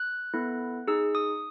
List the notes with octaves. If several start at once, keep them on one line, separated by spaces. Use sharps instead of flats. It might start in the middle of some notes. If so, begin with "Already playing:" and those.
Already playing: F#6
B3 E4 A4
D#4 G#4 E6
D#6